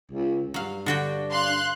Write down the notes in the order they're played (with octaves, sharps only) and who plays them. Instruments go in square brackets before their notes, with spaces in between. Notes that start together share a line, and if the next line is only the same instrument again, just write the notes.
[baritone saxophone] C#2
[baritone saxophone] G2 [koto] F#3 F5
[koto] D3 F#4 G5 [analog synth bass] D4
[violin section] F5 C6 F#6